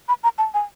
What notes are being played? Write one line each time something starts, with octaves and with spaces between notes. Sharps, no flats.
B5
A#5
A5
G#5